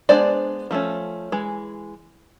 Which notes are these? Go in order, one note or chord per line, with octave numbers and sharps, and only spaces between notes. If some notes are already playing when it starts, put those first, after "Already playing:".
G#3 B3 D4 C5 D5
F3 A3 C#4
E3 G#3